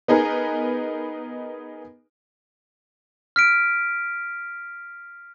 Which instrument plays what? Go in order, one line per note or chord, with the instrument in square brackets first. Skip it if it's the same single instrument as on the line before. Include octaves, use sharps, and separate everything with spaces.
[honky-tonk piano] B3 D#4 G#4 A#4 B4
[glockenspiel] F6 B6 D7